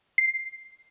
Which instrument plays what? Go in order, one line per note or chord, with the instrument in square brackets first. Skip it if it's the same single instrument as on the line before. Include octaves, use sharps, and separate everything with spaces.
[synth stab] C7